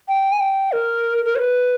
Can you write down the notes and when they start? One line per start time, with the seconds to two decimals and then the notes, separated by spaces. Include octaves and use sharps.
0.08 G5
0.32 G#5
0.40 G5
0.72 A#4
1.25 A#4
1.35 C#5
1.39 B4